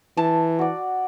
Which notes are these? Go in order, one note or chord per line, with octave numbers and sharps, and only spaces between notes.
E3 A5
F#4 D5